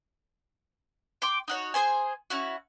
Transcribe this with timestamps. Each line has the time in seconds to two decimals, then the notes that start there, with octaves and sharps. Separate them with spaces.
1.22 G5 C6 D6
1.48 D#4 F#4 C#5
1.74 G#4 C5 G#5
2.30 C#4 E4 F#4